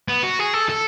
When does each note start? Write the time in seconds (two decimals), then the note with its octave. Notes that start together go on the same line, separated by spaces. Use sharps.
0.08 B3
0.23 F#4
0.39 G#4
0.54 A4
0.69 A4